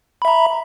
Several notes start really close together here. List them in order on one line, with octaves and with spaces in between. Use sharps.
B5 E5 A#5